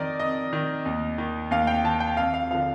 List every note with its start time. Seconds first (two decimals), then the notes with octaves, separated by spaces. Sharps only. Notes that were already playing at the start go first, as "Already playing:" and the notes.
Already playing: F2 D#3 A#4 D5 D#5
0.19 F2 D#5
0.53 D#3
0.86 D#2
1.18 D#3
1.51 D#2 F5
1.67 G5
1.84 D#3 A5
2.00 G5
2.17 F2 F5
2.34 F5
2.51 D3 F3 F5